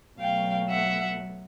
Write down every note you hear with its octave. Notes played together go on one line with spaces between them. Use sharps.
B2 F#3 A3 F5 G5
E5 F#5